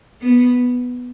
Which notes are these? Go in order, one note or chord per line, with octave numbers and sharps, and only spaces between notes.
B3